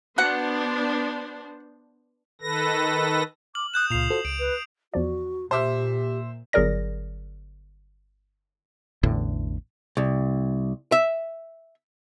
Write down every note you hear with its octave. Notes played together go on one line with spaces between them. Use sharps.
B3 D4 F#4 C5 F#5
D#3 A4 B4 A#6
D6 F6 F#7
D#6 F#6 G6 E7
C#2 A#2 F4 C7 F7
F#4 A4 C5
C#2 D7
B4
E2 F3 F#4 D5
A#2 G4 C5 E5 A5 D6 F6
G1 F#3 G#4 A#4 D5 A#6
A1 E2 A2 D3
C2
E5